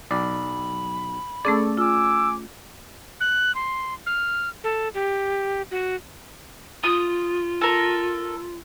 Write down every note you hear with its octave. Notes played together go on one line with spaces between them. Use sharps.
B1 D5 B5
A3 C#4 G#4 A4 D5
F4 G#5 D6 E6
F#6
C6
F6
A4
G4
F#4
F4 D#6
A4 A#4